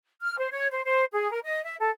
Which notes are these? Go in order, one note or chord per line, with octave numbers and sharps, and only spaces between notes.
F6
C5
C#5
C5
C5
G#4
A#4
D#5
E5
A4